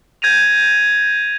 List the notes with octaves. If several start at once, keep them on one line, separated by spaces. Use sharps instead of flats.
G6 G#6 A#6 D#7 F7